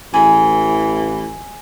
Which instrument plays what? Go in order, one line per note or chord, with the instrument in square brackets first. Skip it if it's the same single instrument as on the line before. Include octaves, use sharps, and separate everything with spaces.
[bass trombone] A1 [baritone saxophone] E3 [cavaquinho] G#4